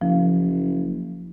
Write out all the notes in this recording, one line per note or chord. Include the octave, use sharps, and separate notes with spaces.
F#1 F3